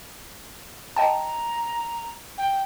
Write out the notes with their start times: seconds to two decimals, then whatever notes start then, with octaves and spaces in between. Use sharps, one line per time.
0.96 D#5 G5 A5 A#5
2.38 G5